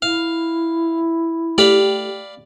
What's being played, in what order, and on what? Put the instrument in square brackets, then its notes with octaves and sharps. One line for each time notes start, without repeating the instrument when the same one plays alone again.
[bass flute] E4 [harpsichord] F5
[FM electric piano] A3 G4 [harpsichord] D5 F5 B5